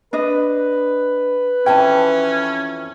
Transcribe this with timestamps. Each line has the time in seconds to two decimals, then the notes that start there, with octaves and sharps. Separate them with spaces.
0.13 D4 B4 D#5
1.66 F2 E3 C#4 G5 A5